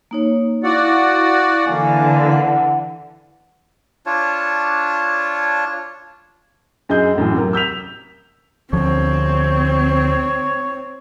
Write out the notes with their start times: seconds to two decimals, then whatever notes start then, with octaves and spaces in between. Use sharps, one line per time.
0.11 A#3 D#4 C#5
0.64 E4 F#4 D5 F5 F#5
1.67 D3 E3 A#3 G#5
2.32 F#5
4.06 D4 F4 C#5 A5
6.89 F#2 G#4 D#5 G6
7.16 A1 F#2 A2
7.34 C3 F#3 A#4
7.53 E6 G6 B6 F7
8.73 D2 F3 C4 C#5